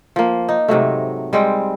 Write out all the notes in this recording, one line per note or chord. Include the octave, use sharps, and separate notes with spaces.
F3 A#3
D#4
G#2 C3 F#3 A3
G3 G#3 C4 G5